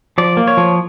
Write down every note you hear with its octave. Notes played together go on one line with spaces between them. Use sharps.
F3 D5
A#3
C#5
F3